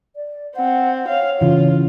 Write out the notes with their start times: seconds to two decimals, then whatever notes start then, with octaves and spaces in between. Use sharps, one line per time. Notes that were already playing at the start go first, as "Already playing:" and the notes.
0.16 D5
0.57 C4 F#5
1.08 C#5 F5
1.41 C#3 E3 F4